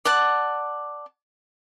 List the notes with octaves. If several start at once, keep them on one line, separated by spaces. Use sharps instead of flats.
D5 F#5 A5